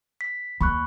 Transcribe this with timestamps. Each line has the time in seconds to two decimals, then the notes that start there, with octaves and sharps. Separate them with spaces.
0.21 B6
0.61 D#2 B5 C#6 F#6